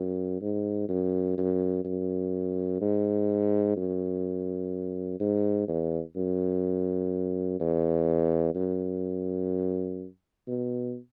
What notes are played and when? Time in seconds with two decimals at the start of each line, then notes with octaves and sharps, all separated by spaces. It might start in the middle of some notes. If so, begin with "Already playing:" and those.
Already playing: F#2
0.42 G#2
0.89 F#2
1.38 F#2
1.85 F#2
2.81 G#2
3.77 F#2
5.20 G#2
5.68 E2
6.16 F#2
7.60 E2
8.55 F#2
10.48 B2